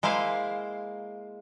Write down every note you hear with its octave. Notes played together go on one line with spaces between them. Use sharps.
G#3 A#3 E4 C5 F5